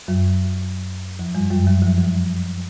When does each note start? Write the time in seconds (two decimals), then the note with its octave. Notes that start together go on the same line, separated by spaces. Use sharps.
0.08 F#2 F#3
1.19 F2 F3
1.35 G2 G3
1.51 F#2 F#3
1.66 F#2 F#3
1.82 F2 F3
1.98 F2 F3